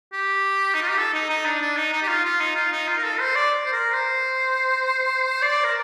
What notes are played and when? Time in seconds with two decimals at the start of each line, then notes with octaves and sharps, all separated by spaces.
0.13 G4
0.75 D#4
0.83 F4
0.90 G4
0.98 A4
1.14 D#4
1.30 D#4
1.45 D4
1.62 D4
1.77 D#4
1.93 D#4
2.02 G4
2.09 F4
2.25 F4
2.41 D#4
2.56 F4
2.72 D#4
2.88 F4
2.98 A#4
3.04 A4
3.20 C5
3.35 D5
3.65 C5
3.73 A#4
3.94 C5
5.42 D5
5.64 A#4